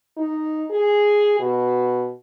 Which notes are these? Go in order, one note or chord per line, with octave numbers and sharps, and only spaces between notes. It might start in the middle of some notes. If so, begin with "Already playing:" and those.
D#4
G#4
B2